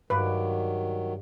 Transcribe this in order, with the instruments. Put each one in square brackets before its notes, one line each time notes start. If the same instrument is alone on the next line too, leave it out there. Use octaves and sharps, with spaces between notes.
[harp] G2 D5 [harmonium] D#3 F#3 [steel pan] B4